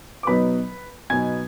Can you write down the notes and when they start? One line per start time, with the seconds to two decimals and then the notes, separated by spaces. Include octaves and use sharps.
0.23 D6
0.27 B2 F#3 B3 D#4 B4 B5
1.10 B2 F#3 B3 D#4 G#5 G#6